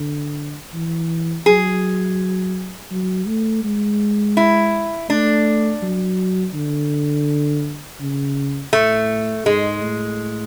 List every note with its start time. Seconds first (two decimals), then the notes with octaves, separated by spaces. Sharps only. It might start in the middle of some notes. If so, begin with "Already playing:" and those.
Already playing: D3
0.73 E3
1.46 F#3 G#4
2.91 F#3
3.27 A3
3.64 G#3
4.37 E4
5.09 A3 D4
5.82 F#3
6.54 D3
8.00 C#3
8.73 A2 A3
9.45 G#2 G#3
9.81 A2